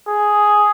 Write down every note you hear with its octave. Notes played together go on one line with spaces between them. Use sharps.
G#4